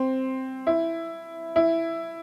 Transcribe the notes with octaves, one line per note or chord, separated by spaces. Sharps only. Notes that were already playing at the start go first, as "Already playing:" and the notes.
Already playing: C4
E4
E4